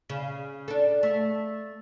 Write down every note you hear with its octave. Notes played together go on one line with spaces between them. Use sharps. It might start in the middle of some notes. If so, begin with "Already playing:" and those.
C#3
D4 A4
A3